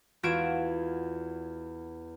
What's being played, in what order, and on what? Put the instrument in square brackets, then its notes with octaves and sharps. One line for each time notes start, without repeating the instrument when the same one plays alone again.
[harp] E2 F4 F#4 G#6 D7 E7